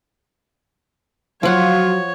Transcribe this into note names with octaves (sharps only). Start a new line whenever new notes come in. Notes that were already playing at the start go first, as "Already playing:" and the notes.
F3 F#3 F4 C#5 F#5